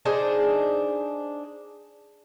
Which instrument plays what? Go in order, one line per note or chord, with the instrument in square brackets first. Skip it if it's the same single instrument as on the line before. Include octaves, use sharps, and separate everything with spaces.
[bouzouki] D4 D#4 G#4 C5